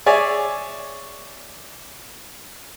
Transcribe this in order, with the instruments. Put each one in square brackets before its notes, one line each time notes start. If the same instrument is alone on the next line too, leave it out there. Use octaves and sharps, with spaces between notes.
[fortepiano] G#4 C#5 D5 E5 G#5